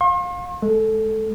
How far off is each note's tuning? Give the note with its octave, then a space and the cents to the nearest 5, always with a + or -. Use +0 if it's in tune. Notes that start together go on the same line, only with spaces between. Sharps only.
F5 +30 C6 +45
G#3 +30 A4 +0